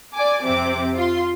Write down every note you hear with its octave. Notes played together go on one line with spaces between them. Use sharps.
D5 G#5 D6
F2 C3 C4 D6
F4 C6